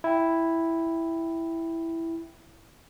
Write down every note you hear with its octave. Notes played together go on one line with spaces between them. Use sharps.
E4 G5